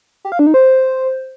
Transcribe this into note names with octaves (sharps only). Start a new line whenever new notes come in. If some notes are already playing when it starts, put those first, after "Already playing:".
G4
F5
D4
D#4
C5